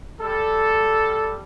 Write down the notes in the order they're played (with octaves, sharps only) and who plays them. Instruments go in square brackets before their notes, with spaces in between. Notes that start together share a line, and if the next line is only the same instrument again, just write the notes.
[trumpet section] G3 A4